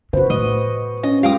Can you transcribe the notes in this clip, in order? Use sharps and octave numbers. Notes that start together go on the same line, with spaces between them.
C#3 F#4 B4 C5
A2 D#5
C#4 D#5
G#3 F4 G4 F5 D6 D#6